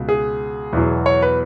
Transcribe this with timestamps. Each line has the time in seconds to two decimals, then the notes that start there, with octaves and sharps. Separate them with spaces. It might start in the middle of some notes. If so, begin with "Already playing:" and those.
Already playing: C#2 B2
0.09 G#4
0.73 E2 B2 F#3
1.06 C#5
1.22 B4